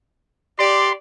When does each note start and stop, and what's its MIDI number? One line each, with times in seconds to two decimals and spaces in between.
0.59 0.91 67
0.59 0.91 74
0.59 0.93 84